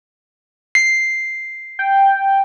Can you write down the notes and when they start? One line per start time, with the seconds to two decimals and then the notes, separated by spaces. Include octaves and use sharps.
0.75 C7
1.79 G5